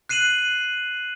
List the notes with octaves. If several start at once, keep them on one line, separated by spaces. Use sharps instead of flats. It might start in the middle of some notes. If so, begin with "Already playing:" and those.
F#6 C7 D#7 E7 F#7